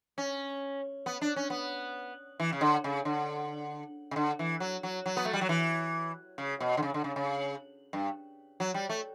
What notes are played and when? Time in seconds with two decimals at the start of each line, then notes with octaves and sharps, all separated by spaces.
0.18 C#4
1.06 B3
1.21 D4
1.36 C#4
1.50 B3
2.40 E3
2.53 C#3
2.61 D3
2.84 C#3
3.05 D3
4.11 C#3
4.16 D3
4.39 E3
4.60 F#3
4.83 F#3
5.06 F#3
5.17 B3
5.25 A3
5.33 G3
5.41 F#3
5.49 E3
6.38 C#3
6.60 B2
6.77 D3
6.83 C#3
6.94 D3
7.04 C#3
7.16 C#3
7.93 G2
8.60 F#3
8.74 G3
8.89 A3